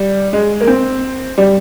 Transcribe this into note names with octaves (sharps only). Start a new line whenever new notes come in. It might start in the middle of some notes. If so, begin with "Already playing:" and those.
Already playing: G3
G#3
A#3
C4
G3